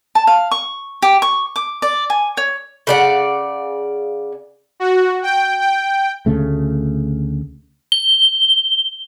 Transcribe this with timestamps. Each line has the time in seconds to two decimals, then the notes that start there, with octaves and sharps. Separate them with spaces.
0.15 A5
0.27 F5
0.51 C#6
1.02 G4
1.22 C#6
1.56 D6
1.82 D5
2.10 G#5
2.37 C#5
2.87 C#3 D5 F#5
4.80 F#4
5.23 G5
5.60 G5
6.26 D2 C#3 A3
7.92 G7